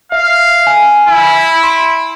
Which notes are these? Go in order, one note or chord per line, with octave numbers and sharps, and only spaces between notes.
E5 F5
G#5
E4
C6 D7